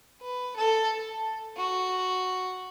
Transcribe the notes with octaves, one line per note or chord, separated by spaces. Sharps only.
B4
A4
F#4